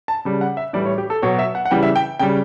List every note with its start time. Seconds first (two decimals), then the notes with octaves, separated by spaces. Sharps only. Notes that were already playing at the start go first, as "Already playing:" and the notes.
0.08 A5
0.25 C#3 G3
0.41 F#5
0.57 E5
0.73 A2 E3 G3 D5
0.85 C#5
0.98 G4
1.10 A4
1.22 B2 F#3 C#5
1.39 E5
1.55 F#5
1.65 F#5
1.71 C#3 E3 G3 G5
1.83 E5
1.96 G5
2.19 C#3 G3 G5